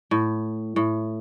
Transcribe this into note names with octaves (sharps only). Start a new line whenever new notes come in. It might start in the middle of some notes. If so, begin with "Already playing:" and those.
A2
A2